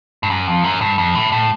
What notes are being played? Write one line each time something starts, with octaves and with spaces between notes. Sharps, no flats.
G2
F#2
F2
F#2
G2
F2
A2
A2